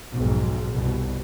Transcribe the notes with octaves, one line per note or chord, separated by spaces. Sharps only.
B1 F2 G#2
G1 C2 B2